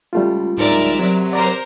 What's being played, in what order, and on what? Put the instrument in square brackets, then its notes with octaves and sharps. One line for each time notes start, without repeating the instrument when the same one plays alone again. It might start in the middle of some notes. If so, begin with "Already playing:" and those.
[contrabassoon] C#2 [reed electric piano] G3 A3 F4
[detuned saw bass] D1 [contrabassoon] G#2 [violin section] A#4 D5 E5
[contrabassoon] C3 [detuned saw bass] F#3
[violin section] A#4 C5 [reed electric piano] D5 A#5 D6